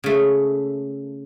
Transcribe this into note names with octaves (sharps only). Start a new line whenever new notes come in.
C#3 A3